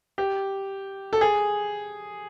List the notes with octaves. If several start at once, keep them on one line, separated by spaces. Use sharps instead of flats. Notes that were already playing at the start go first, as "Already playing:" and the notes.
G4
A4
G#4